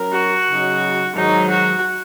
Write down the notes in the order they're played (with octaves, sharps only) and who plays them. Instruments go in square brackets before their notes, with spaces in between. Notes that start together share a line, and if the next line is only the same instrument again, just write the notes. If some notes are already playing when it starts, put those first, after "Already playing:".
Already playing: [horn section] F#3 C#4 A#4
[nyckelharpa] F#4
[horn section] C#3 F#3 D#4
[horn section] G#2 D#3 F#3 [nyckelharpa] D#4
[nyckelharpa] F#4